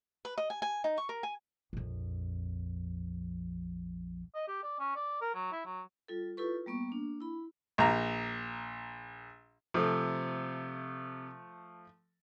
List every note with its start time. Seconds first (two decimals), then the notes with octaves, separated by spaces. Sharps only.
0.25 B4
0.38 D#5
0.50 G#5
0.62 G#5
0.84 D#4
0.98 C#6
1.09 A#4
1.23 G#5
1.73 A#1 F2
4.35 D#5
4.48 G4
4.63 D5
4.79 C#4
4.95 D5
5.21 A#4
5.34 F#3
5.52 E4
5.65 F#3
6.08 G3 F4 A4
6.37 E4 F4 G4 A4 B4 C#6
6.66 G3 A#3 B3 C#6
6.90 A#3 D4
7.20 E4 B5
7.78 A#1 A#5
9.74 C3 F3 A3